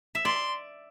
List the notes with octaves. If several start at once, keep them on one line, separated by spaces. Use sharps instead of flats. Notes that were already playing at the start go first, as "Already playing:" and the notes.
E5
D5 C6